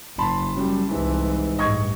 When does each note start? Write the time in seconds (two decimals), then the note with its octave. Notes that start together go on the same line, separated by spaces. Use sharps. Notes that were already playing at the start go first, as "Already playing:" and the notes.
0.19 F#1 A5 B5 C6
0.57 F#2 G3
0.91 C2 G#2 E3
1.59 A1 G2 D#5 C#6 G#6